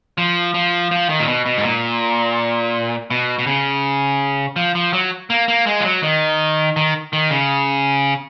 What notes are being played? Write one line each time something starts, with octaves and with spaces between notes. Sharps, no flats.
F3
F3
F3
D#3
A#2
B2
B2
G#2
A#2
B2
B2
C#3
F3
F3
F#3
A#3
A#3
G#3
F3
F#3
D#3
D#3
D#3
C#3